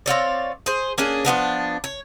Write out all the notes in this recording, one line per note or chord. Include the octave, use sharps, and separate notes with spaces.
C4 F4 C#5 D5
G#4 C5
A#3 C#4 D4 G#4
F3 G3 B3 D4
C#5